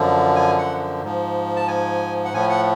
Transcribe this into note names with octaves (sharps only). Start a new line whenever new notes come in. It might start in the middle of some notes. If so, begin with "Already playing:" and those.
Already playing: F#2 D3 F3
G#5
F#5
G#2 F3
A5
G#5
F#5
A2 F3 G#5
F#5